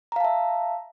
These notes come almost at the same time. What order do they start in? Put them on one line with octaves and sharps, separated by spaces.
A#5 F5 A5 E5